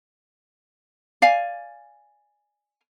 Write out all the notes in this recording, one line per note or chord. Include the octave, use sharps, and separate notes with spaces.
D5 F5 G#5